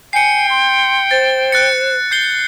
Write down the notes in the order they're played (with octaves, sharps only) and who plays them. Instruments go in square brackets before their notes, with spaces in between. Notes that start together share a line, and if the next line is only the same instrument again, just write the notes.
[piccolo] G5 [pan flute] G#5 [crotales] C7 C#7
[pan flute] C6
[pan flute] C5 [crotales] A6
[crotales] F#6 A6 C#7
G6 C7 G7